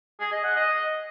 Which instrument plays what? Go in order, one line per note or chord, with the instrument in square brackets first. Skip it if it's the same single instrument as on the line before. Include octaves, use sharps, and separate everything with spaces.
[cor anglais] G#4
D#5
F#5
D#5